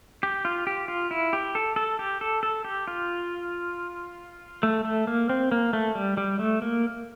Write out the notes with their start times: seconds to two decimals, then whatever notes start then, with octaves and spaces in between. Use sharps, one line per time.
0.23 G4
0.45 F4
0.67 G4
0.88 F4
1.11 E4
1.33 G4
1.55 A4
1.76 A4
1.99 G4
2.21 A4
2.43 A4
2.64 G4
2.88 F4
4.63 A3
4.85 A3
5.07 A#3
5.29 C4
5.52 A#3
5.73 A3
5.95 G3
6.17 G3
6.39 A3
6.62 A#3